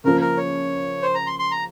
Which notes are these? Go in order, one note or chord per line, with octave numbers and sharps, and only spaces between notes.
C#3 F3 A#3 A#4
A#4
C#5
C5
A#5
C6
C6
A#5